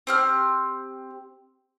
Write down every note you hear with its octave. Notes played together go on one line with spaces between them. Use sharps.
C4 G4 F6